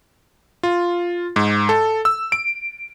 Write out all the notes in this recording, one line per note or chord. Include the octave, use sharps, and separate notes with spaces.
F4
G#2
A4
E6
D7